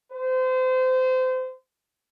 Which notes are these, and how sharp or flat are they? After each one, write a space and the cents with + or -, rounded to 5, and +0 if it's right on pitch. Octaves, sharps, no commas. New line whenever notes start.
C5 -30